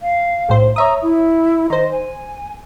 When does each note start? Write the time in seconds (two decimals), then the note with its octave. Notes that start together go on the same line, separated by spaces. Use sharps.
0.02 F5
0.48 B1 A2 C5
0.76 C#5 E5 A#5 D#6
1.02 E4
1.70 D#3 C5 D#5
1.92 G#5